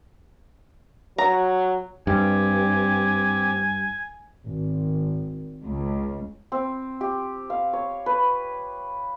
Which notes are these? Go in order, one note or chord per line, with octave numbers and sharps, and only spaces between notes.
F#3 A#5
G2 C4 G4 G#5
G#1
C#2
C4
G4
F5
C#5
B4